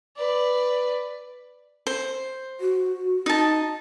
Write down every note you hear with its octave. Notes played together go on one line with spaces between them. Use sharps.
B4 D5
C5
F#4
D#4 A5